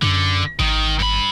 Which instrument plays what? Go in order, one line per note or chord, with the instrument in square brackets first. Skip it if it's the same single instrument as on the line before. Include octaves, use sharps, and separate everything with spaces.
[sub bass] F#2 [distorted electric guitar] D3
[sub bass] G#1 [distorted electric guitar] D#3
[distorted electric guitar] G2 B5